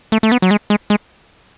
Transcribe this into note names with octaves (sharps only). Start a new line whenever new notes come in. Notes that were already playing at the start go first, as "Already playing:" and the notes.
A3
A3
B3
F#3
G#3
G#3
G#3